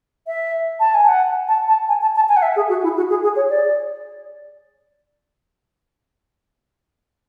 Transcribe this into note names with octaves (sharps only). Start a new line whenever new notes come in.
E5
A5
G#5
F#5
A5
A5
G#5
A5
A5
G#5
F#5
E5
G#4
F#4
E4
F#4
G#4
G#4
C#5
D5